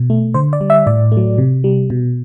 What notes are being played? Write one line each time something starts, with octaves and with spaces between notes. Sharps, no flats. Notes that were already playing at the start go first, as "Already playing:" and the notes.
Already playing: B2
A3
D3 C5
D5
G3
E5
A2 D5
A3
F#3
C3
G3
B2